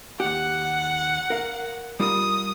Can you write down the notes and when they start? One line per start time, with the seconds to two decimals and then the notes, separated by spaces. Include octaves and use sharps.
0.20 D#2 G4 F#5
1.30 A#4 F5
2.00 G3 F4 A#4 D#6